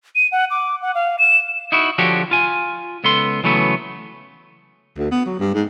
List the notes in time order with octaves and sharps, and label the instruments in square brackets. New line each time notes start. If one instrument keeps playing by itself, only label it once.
[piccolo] D#7
F#5
D6
F#5
F5
E7
[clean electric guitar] D#4 E4 F#4
D3 F3 F#4 G4 C#5
F4 G#5
C#2 B3 A4 C6
C#3 E3 F#3 A3 B3
[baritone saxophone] D2
B3
F#3
G2
G#2